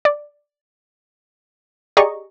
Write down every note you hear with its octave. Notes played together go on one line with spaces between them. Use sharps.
D5
G4 G#4 D5 D#5 A#5 C#6